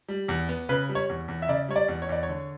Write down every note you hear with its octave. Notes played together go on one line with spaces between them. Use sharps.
G3
E2
B3
C#3 B4
G3
C#5
E2
E2
E5
C#3 D5
G3 C#5
D5
E2
C#5
E2 D5
C#5
D3